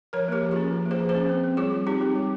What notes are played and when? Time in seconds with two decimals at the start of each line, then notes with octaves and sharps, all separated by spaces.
0.13 F3 A#4 C#5
0.28 A#3 G4 A#4
0.43 F3
0.51 F4 G#4
0.56 C#4
0.71 F3
0.86 A#3
0.91 G#4 C5
1.00 F3
1.09 G#4 C5
1.15 C#4
1.29 C4
1.44 C4
1.57 G3 F4 G#4
1.72 G3
1.87 C4 D#4 G4
2.01 C4
2.15 G3